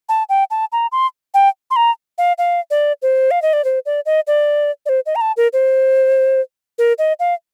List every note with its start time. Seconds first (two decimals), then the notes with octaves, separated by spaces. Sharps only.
0.09 A5
0.29 G5
0.51 A5
0.72 A#5
0.92 C6
1.34 G5
1.71 C6
1.76 A#5
2.18 F5
2.38 F5
2.71 D5
3.02 C5
3.31 F5
3.42 D#5
3.53 D5
3.65 C5
3.86 D5
4.06 D#5
4.27 D5
4.86 D5
4.89 C5
5.06 D#5
5.16 A#5
5.21 A5
5.37 A#4
5.53 C5
6.78 A#4
6.98 D#5
7.20 F5